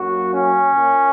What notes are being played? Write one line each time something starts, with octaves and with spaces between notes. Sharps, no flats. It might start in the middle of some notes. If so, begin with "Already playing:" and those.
Already playing: F#2 F#3 A#3 F#4
C#4
A#2 A#3